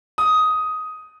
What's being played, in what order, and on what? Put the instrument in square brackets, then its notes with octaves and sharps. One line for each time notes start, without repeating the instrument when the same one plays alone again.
[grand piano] D#6